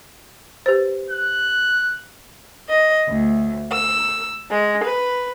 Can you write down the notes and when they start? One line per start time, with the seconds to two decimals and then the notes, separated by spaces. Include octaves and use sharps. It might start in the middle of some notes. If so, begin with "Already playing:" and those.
0.66 G4 B4 C5
1.10 F#6
2.69 D#5
3.07 D2
3.72 E6
4.51 G#3
4.84 B4